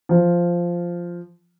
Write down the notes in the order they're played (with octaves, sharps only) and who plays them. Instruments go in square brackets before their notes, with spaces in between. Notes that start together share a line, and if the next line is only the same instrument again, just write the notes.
[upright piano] F3